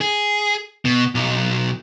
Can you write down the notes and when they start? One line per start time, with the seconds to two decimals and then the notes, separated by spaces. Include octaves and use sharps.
0.01 G#4
0.85 B2
1.15 B1